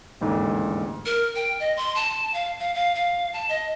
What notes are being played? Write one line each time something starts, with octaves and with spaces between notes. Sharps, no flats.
A1 D#2 G#2 D3
A#4
G5
D#5
C6
A5
F5
F5
F5
F5
A5
D#5